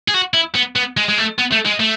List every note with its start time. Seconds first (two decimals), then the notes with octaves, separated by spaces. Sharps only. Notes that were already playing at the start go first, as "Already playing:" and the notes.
0.08 G#4
0.14 F#4
0.34 E4
0.55 B3
0.76 B3
0.97 G#3
1.09 G#3
1.18 A3
1.38 B3
1.52 A3
1.65 G#3
1.80 A3